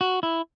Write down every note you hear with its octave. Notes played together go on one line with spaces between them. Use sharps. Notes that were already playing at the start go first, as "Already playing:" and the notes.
F#4
E4